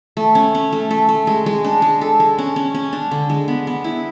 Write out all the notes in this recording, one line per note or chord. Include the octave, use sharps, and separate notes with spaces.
A3
C#4
C#4
A3
A3
A3
G#3
G#3
D4
G#3
A4
G#3
C#4
C#4
C#4
D4
D3
G#3
B3
B3
E4